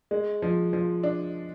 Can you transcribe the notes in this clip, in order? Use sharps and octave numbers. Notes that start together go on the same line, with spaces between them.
G#3
F3
F3
D4